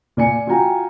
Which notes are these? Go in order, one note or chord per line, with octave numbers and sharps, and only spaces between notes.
A#2 D5 G#5 C#7
F4 F#4 G5 G#5 A#5